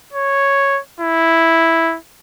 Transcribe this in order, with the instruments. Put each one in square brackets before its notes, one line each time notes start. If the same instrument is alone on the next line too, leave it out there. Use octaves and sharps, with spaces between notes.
[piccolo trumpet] C#5
E4